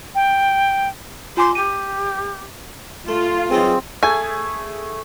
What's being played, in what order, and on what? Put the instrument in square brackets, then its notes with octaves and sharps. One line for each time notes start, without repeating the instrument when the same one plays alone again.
[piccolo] G5
[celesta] F4 G#5 D6 [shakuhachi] C6
[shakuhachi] G4 [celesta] D#7
[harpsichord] A3 [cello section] F4
[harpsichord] E3 F#3 D#4 [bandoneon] C4 [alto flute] G#4
[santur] A3 [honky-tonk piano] G#4 G#6 [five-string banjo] G#5